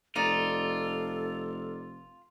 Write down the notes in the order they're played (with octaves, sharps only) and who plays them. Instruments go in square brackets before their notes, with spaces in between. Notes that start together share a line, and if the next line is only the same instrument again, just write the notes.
[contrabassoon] F1 [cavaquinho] D#4 D5 [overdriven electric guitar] F4 [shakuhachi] A4